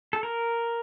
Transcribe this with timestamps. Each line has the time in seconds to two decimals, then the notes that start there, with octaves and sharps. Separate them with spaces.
0.13 A4
0.23 A#4